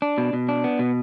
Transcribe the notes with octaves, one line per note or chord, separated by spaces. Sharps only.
D4
B2
B2
D4
B3
B2